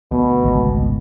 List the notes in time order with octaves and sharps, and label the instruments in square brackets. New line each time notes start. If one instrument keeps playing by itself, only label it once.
[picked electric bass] D2 A3 B3 [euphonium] B2
[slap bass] G#1 C#2 C3